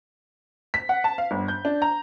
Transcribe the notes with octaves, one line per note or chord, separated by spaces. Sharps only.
B6
F#5
A5
F5
G1
G6
D4
A#5